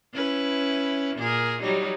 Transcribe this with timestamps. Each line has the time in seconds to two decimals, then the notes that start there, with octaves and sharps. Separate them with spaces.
0.14 C#4 E4 B4
1.16 A#2 G#4 A#4
1.62 F#3 G3 D#4